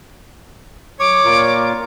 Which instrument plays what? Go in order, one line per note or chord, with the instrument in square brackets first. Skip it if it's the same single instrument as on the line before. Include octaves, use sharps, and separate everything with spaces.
[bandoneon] F#3 [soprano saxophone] C#5 [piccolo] D6
[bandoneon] A#2 F4 A#4